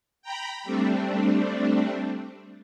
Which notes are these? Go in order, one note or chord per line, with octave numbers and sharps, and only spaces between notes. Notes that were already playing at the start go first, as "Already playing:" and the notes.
G5 A#5 B5
G3 A3 C4 D4